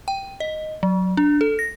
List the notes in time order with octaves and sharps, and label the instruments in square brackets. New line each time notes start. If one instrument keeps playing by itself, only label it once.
[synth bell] G5
D#5
F#3
D4
A4
A#6